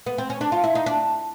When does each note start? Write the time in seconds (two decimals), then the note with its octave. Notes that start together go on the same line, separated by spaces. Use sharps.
0.06 B3
0.18 C4
0.30 C#4
0.41 D4
0.52 F4
0.64 E4
0.75 D#4
0.86 D4